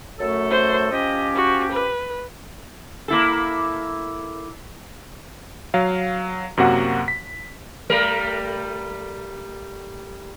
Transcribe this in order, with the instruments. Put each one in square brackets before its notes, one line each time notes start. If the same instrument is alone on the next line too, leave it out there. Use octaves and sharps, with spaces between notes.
[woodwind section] F#2 A3 A4
[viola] C5
[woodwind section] F3 C#4 G4 [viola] D#5
[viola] F#4
B4
[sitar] A#3 E4 A4
[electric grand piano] F#3 F5
F#2 C3 A#3 F#4 F#5
B6
[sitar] G3 A3 A#4